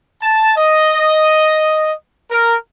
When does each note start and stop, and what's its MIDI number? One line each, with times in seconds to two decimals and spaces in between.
0.22 0.53 81
0.56 1.92 75
2.30 2.54 70